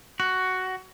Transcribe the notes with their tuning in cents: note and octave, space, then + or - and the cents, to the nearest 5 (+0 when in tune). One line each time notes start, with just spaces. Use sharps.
F#4 +10